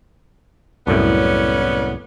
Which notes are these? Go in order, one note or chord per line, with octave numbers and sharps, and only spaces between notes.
C2 F#2 A2 B3 C#4 D5